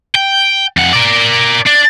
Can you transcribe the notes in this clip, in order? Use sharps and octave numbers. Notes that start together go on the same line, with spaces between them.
G5
F2 F#5
A#4 D5
D4